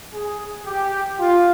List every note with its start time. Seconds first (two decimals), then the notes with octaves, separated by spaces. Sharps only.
0.14 G#4
0.67 G4
1.20 F4